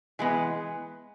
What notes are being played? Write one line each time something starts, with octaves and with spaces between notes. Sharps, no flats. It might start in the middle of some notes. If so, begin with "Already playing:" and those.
E3 G#3 B3